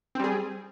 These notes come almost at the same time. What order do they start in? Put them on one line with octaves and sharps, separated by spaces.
C4 G3 G#4